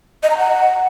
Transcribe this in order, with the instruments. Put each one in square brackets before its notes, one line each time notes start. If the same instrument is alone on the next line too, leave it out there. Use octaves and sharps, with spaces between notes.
[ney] D#5
A#5
F#5